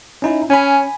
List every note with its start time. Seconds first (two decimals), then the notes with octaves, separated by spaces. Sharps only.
0.22 C#4 D#4 E4
0.50 C#4 G#5 B5